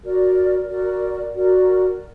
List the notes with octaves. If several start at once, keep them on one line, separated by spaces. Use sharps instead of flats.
F#4 A#4 D5
F#4 A#4 D5
F#4 A#4 D5